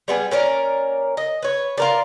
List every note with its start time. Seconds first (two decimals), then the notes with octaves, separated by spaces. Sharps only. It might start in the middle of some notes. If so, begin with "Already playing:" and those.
0.08 G3 B3 E4 G#4
0.31 A#3 C#4 A#4 D5
1.17 D#5
1.42 B4 C#5
1.77 F4 A#4 D5